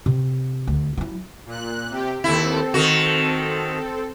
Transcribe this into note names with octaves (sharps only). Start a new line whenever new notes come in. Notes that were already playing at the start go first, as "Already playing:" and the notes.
C3
D2
F#3 E4
A#2 F#6
C3 G4
D#2 C4 E4 A4
D#3 F#4